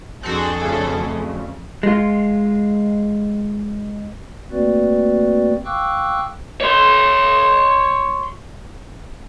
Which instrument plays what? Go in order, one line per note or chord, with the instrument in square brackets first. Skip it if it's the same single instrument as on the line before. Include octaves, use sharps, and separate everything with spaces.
[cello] F2 [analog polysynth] C4 F#4 [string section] D4 G#4 A4
[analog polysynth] D2 C#3
[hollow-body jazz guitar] G#3 F4
[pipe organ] A3 A#3 C4 F#4 B4 D5
F5 G5 C#6 D6 E6 F#6
[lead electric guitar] C#5 C6